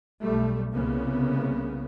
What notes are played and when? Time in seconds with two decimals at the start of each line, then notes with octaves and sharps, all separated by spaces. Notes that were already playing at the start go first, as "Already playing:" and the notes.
0.21 B1 G3 A3
0.71 C2 C#3 A#3 B3